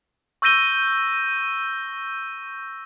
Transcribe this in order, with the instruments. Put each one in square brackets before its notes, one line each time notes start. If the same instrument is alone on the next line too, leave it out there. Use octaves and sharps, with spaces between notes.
[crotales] C#6 E6 G6 A#6 D#7 G7